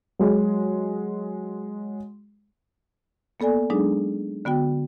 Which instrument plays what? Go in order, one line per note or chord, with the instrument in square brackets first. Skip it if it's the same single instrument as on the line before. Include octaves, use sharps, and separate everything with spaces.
[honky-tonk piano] F#3 G#3
[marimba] A#3 B3 A4 D5 G#5
F#3 G#3 D4 D#4 G#4
D3 B3 F#4 G5